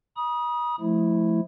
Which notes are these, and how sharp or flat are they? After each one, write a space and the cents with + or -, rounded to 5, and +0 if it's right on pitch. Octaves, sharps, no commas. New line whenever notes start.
B5 -45 D#6 +0
F3 +0 A3 -20 E4 +0